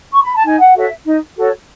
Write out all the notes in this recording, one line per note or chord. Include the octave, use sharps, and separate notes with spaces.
C#6
B5
A5
D#4 G#5
F#5
F#4 A4 C#5 E5
D#4
F#4 A4 C#5